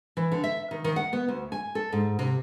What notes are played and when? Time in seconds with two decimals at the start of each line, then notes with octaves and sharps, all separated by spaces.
0.17 E3
0.32 D3
0.44 E5
0.71 D#3
0.84 D#3
0.96 F#5
1.13 B3
1.28 D2
1.52 G#5
1.75 A4
1.92 G#2
2.19 C3